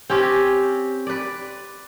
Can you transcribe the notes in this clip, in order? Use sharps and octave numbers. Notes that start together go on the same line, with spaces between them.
C4 C#4 G4
B4 D5